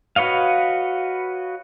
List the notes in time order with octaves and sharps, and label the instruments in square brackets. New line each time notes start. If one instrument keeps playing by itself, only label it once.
[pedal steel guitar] F#4 B4 C#5 D#5 F5